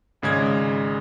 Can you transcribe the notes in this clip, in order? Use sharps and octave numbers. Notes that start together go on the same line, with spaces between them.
G#1 C#3 G#3 G#6